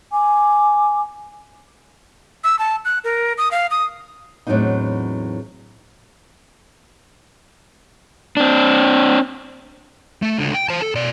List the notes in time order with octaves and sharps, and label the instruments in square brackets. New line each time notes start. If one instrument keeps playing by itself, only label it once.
[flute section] G#5 D6
[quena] E6
A5
F#6
A#4
D#6
F5
D#6
[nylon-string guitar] E2 A2 F#3 C4 D4 D#4
[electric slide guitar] C4 D4
[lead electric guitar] A3
C#2 D3
G5
C5 A5
A4
B2 D5